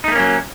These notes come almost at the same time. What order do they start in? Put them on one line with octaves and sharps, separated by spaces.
D#4 A3 A#3 C#4 F#3